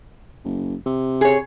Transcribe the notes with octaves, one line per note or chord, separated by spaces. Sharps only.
F#1
C3
G#4 C#5